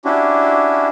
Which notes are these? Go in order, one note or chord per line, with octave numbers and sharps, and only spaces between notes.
C#4 D4 E4 F#4 G4